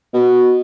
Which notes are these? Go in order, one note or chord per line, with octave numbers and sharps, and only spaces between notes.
B2